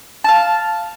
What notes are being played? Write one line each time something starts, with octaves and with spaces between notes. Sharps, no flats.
F5 A5